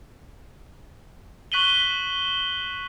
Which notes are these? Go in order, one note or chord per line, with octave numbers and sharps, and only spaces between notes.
C#6 F#6 B6 D#7 F#7 G7